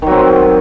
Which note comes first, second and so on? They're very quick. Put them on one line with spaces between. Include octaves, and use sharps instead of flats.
D#3 F#3 C4